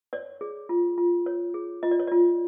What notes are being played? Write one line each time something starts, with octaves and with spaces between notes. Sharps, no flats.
C#5 D5
G#4
F4
F4
C#5
G#4
F4 D#5
D5
C#5
F4 D5